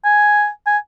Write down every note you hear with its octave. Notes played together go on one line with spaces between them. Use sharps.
G#5
G#5